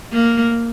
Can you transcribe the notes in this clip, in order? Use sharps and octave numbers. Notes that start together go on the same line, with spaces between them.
A#3